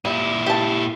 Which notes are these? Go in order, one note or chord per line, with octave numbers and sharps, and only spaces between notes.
A#2 G3 E4
G4 A5